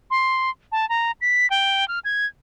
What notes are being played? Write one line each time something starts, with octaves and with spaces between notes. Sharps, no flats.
C6
A5
A#5
B6
G5
F6
G#6